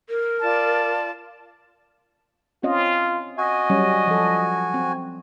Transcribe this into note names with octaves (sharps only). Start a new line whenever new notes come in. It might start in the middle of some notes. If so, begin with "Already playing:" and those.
A#4
F4 D5 A5
C4 C#4 F4 D#5
F#4 D#5 G#5
F#3 G3 C#4
F3 A4
C4